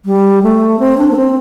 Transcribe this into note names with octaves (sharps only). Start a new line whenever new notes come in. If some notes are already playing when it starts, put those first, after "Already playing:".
G3
A3
C4
D4
A#3
C4